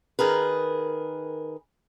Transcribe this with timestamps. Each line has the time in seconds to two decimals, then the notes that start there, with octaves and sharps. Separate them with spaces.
0.19 D#3 G#4 A#4 B4